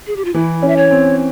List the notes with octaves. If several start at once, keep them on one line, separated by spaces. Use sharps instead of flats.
G#4
G4
F4
E3 E4
C#4
E5
C#5
C4